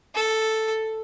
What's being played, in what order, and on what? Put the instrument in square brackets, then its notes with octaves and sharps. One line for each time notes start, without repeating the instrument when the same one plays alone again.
[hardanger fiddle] A4